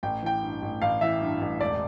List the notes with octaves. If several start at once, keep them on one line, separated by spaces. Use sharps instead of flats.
A1 G5
E3 G5
G2
A1
A1 F5
E3 E5
G2
A1
E1 D5